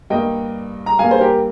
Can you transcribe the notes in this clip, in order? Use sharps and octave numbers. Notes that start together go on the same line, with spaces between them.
G2 G3 A#3 D#5 G5
A#5
G2 G3 A#3 F5 G#5
C5
G4 A#4